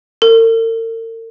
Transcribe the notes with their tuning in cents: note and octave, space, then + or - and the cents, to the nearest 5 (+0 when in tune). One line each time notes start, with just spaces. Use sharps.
A#4 -45